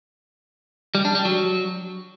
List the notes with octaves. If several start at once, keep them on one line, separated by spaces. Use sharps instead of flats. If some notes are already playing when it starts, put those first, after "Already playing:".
G3
D4
G3
F#3